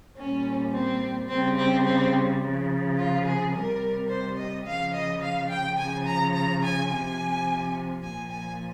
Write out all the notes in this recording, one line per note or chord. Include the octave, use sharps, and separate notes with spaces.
A#2 G3 C#4
C4
C#3 G3 C4
C4
C4
C#3 F3
F4
G#4
C3 G3 A#4
C5
D#5
C#3 F3 F5
D#5
F5
G5
C#3 F3 G#5
A#5
A#5
G#5
C3 F3 G#5
A#2 F3 G#5
G#5